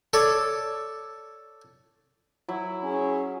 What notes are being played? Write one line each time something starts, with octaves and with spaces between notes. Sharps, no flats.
A4 C#5 D5
F#3 E4
C#4 G#4